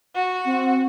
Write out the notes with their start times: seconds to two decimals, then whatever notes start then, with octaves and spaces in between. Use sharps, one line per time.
0.15 F#4
0.45 C4